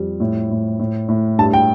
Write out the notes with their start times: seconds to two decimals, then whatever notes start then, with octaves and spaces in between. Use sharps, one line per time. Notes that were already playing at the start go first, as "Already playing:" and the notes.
Already playing: F2 G3
0.20 A2
0.50 A2
0.79 A2
1.08 A2
1.38 G2 A5
1.53 G5